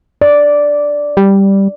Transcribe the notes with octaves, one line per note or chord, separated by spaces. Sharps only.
D5
G3